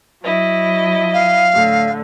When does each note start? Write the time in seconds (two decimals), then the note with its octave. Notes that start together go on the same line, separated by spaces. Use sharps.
0.23 F#3 E4 D#5
1.14 F5
1.53 A2 D3